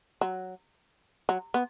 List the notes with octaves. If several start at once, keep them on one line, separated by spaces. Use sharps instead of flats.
F#3
F#3
B3